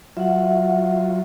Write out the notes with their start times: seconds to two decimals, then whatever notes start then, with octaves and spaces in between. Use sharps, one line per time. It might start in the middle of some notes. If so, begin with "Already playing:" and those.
0.17 F#3 F4 E5 F#5